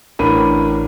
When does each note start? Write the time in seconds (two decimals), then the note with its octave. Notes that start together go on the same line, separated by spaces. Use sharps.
0.19 A1 A2 D4 A#4 B5 D#7